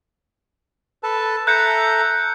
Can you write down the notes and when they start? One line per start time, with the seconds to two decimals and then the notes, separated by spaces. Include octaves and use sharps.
1.03 A4 B4 A5
1.47 A4 E5 A#5 F#6 G6 C#7